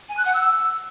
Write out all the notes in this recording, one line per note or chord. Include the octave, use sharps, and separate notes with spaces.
G#5
F#6
F#5
E6